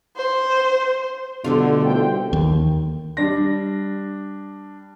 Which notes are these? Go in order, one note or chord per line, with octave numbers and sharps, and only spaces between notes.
C5
B2 D3 G3 A3 F4
C2 C5 G5
D#2
G3 D4 A#6